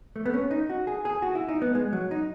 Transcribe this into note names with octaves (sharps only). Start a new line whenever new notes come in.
A3
B3
C#4
D#4
F#4
G#4
G#4
F#4
E4
D#4
B3
G#3
F#3
D#4